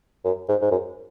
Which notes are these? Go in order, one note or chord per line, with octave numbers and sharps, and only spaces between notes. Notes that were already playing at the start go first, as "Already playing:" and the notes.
F#2
G#2
G#2
F#2